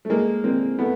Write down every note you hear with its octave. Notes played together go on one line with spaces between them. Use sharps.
A3
G#3 A#3
A#3 C4
A3 B3